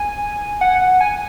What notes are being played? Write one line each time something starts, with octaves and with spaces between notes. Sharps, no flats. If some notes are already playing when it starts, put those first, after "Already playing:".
Already playing: G#5
F#5
F#5
G#5